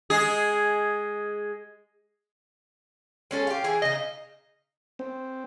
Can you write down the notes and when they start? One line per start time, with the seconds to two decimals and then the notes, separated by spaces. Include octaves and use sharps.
0.10 G#3 G#4
3.31 G#3 C#4 A4
3.47 G4 F5
3.64 E3 G#4
3.82 C#3 D#4 D#5
4.99 C4